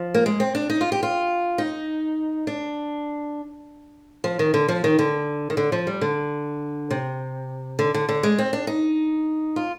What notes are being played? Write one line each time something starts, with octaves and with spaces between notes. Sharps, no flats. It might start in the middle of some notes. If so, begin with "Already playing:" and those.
Already playing: F3
A#3
G#3
C4
D4
D#4
F4
G4
F4
D#4
D4
F3
D#3
D3
F3
D#3
D3
D#3
D3
F3
G3
D3
C3
D3
D3
D3
G#3
C4
D4
D#4
F4